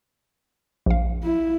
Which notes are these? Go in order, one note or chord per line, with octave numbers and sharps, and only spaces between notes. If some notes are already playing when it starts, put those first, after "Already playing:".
A#1 F5
E4